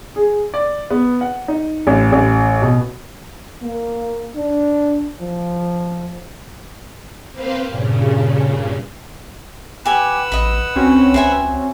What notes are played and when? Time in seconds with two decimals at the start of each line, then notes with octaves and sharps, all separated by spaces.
0.16 G#4
0.54 D5
0.90 B3
1.21 F#5
1.48 D#4
1.87 A1
2.12 A1
2.62 B2
3.63 A#3
4.36 D4
5.21 F3
7.32 A#3 C4 B4 C5 F5
7.67 G2 A#2 C#3
9.85 G4 B4 F#5 G#5 E6
10.32 A1 D#5 B5
10.76 C#2 C4 C#4 F#4
11.14 C#2 C5 E5 G#5